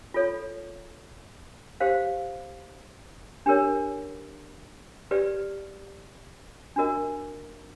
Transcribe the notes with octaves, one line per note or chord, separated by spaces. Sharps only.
F4 A4 C#5
G4 C5 F5
D4 G4 A#4 C#5
G4 B4 D5
D4 F#4 A#4 D#5